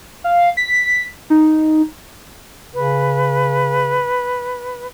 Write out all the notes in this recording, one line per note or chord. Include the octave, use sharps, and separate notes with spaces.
F5
B6
D#4
C#3 B4